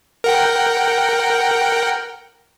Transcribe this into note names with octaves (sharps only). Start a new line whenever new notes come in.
A#4 F#5 G5